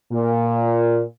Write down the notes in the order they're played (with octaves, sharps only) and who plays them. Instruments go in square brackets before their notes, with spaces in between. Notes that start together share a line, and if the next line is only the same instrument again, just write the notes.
[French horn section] A#2